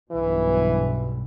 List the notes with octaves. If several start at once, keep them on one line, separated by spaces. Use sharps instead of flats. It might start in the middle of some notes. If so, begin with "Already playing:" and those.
B1 G2 B2 E3